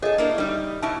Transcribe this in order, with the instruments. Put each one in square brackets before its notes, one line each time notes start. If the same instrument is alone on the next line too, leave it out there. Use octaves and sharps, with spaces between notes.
[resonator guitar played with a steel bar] G#4 A4 [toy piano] C#5 D#5
[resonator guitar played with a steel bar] A#3 D4 E4
G3 D#4
[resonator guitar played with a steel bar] B2 E4 [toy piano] A5